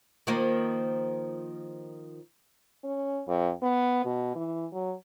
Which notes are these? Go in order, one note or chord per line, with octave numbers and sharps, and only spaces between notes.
D#3 F3 A#3
C#4
F2
B3
B2
E3
F#3